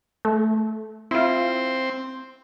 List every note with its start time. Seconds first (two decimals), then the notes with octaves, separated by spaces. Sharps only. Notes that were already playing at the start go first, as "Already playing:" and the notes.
0.25 A3
1.11 C4 E4 F4